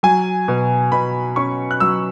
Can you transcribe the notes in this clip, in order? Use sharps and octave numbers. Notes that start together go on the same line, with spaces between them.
F#3 G#5
B2
B2 B5
C#4 C#6
F#6
F#3 E6